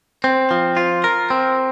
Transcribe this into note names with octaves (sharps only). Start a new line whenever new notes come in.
C4
F3
F4
A#4
C4